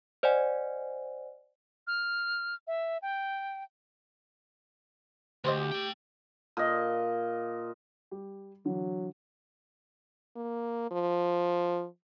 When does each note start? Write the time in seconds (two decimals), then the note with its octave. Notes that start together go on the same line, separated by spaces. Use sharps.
0.23 C5 D5 D#5 F#5 G#5
1.87 F6
2.67 E5
3.02 G5
5.44 D2 G4 B4 C5 D#5
5.72 A3 G5
6.57 A#2 D#5
8.11 G3 G4
8.66 D3 E3 F#3
10.36 A#3
10.91 F3